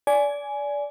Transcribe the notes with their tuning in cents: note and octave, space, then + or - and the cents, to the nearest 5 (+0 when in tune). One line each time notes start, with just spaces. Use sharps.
D5 -20 G#5 +10